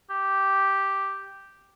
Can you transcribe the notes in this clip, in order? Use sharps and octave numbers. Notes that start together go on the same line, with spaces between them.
G4